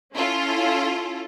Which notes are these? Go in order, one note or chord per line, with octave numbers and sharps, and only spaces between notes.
C#4 E4 F4 A4